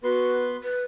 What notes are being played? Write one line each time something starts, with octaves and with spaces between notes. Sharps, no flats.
B3 F#4 B4 C6
B4